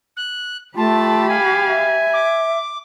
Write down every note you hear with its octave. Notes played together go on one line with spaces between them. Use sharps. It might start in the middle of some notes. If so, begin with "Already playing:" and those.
F#6
A3 F4 G4 A5 B5
F5 G#5
E5
D6